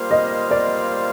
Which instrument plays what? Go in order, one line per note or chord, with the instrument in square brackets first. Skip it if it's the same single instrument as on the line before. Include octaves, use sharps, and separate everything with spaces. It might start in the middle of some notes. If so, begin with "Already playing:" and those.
Already playing: [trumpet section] G3 A#3 F4 C5 F5
[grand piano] D#5
D5